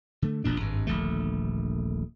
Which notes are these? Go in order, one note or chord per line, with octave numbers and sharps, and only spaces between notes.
D3 A3
E1 A#1 A#2 D4
G#1 G2
D#1 A#1 D3 A3